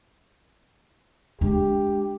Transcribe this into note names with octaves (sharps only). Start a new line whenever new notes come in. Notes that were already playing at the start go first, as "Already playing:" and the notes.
G#3 D4 G4